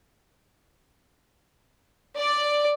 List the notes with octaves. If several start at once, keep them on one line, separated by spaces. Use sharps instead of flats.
D5